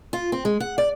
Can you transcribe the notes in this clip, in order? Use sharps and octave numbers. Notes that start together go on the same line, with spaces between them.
F4
C4
G#3
F#5
D5